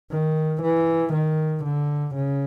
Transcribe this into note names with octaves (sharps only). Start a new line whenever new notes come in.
D#3
E3
D#3
D3
C#3